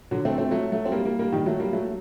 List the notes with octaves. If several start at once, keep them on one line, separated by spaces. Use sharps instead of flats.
D3 F#3
A3 C4
A3 C4
F#3 A3
F#3 A3
C4
G3 A#3
G3 A#3
G3 A#3
D#3 G3
F#3 A3
G3 A#3
F#3 A3